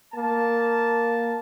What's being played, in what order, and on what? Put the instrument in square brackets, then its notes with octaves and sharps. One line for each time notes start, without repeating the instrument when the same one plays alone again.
[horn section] A#3 A5